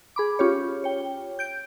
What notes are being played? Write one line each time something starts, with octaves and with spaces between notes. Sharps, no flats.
G#4 B5 D6
C#4 F4 G4 C#5
C#5 G5
G6 D7